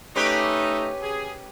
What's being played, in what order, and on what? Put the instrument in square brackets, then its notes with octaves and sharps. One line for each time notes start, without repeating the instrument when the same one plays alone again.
[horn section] A3 D#4 [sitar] C#4 G4 B4
[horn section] G#4